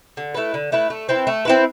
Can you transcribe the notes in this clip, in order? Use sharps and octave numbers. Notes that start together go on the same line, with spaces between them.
D3
A3 E4 B4
D3
A3 E4 B4
A3
C4 E4 B4
A3
C4 E4 B4